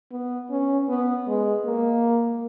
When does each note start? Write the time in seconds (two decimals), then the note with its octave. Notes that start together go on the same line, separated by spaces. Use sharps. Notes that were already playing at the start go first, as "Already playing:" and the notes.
0.12 B3
0.50 C#4
0.89 B3
1.27 G#3
1.65 A#3